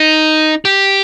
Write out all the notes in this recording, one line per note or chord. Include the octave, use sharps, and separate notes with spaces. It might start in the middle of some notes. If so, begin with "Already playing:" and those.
Already playing: D#4
G4